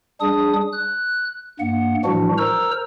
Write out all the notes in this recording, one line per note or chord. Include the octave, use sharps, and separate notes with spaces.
G3 D4 G#4 D#6
F#6
G2 A#3 F#5
A2 E3 F3 G3 D4 F#4
A#4 C5 A#5 E6